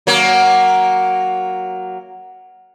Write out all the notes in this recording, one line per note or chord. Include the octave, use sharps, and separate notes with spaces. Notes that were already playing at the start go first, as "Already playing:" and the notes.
F#3 A#3